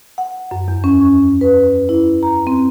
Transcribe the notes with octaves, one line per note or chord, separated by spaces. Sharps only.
F#5
F#2
E2
C#4
C#6
B4
E4
A#5
C4